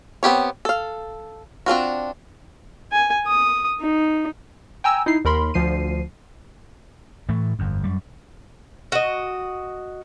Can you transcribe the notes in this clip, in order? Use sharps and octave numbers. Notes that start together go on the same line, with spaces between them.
B3 C4 G4 C#5
A4 F5
C4 D4 F4 F#4
G#5
D#6
D#4
G5 G#5 A#5 E6
D#4 E4 C7
D#2 A#4 B5 C6
D2 F3 C7 D#7
A2 E3 A3
G1 F2
F#2 G3
F#4 D#5